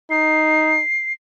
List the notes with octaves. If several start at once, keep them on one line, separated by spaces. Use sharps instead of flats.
D#4 C7